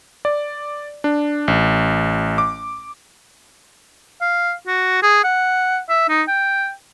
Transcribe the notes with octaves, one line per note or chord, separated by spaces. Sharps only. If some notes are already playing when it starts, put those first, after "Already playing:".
D5
D4
A1
D6
F5
F#4
G#4
F#5
E5
D#4
G5